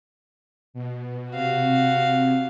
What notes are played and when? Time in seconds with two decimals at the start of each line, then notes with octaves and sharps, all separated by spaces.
0.74 B2
1.31 C3 F#4 F5